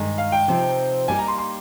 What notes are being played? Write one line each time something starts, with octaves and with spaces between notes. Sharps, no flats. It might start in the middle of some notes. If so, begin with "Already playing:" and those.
Already playing: G2 D#3 G#3 D#4
F5
G5
C3 F3 C4 D#4
G3 A#3 D#4 G4 G#5
A#5
C6
C6